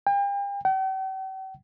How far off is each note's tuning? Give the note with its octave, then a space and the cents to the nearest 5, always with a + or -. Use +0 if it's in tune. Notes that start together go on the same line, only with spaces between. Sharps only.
G5 +40
G5 -45